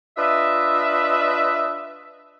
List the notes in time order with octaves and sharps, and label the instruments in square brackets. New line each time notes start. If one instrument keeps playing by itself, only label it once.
[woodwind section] D4 F4 B4 D#5 E5